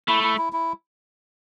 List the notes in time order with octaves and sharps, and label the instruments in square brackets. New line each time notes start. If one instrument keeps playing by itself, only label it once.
[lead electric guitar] A3 [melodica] E4
[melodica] E4
E4
E4